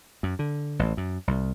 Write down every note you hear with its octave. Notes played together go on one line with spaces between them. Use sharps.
F#2
D3
A1
F#2
C2